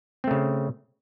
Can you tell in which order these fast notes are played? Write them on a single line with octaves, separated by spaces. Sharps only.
C4 A3 C#3